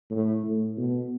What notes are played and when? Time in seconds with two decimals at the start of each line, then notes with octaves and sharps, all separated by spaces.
0.10 A2
0.43 A2
0.77 B2